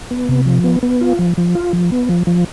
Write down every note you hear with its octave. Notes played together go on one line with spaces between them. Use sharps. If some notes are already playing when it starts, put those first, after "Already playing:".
B3
C3
F3
B3
B3
F4
F3
F3
F4
F3
B3
F3
F3